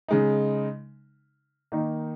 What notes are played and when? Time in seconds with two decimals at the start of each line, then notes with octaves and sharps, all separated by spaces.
0.08 C#3 G#3 D#4
1.72 D#3 A#3 D#4